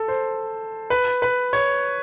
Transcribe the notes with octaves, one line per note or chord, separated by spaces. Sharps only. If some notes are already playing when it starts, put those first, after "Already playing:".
Already playing: A4
C5
B4
B4
C#5